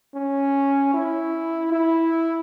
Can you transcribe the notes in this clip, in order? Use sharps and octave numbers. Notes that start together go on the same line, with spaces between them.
C#4
E4
E4